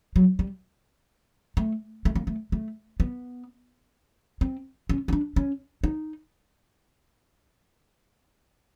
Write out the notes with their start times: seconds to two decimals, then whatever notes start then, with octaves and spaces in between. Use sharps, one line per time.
0.16 F#3
0.39 G3
1.57 A3
2.05 A3
2.15 A#3
2.27 A3
2.52 A3
3.00 B3
4.41 C4
4.89 C#4
5.08 C#4
5.13 D4
5.36 C#4
5.84 D#4